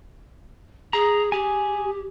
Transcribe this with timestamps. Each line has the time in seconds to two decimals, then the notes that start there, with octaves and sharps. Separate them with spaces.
0.93 G#4 A#5
1.32 G4 G#4 G#5